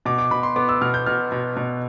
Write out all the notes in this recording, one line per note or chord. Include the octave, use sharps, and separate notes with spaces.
B2 D6
D6
B2 B5
C6
B3 D6
E6
B2 F6
G6
B2 F6
B2
B2